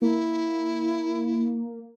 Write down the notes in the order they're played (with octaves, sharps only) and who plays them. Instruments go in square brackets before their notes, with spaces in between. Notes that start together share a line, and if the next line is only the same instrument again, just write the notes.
[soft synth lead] A#3 [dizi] E4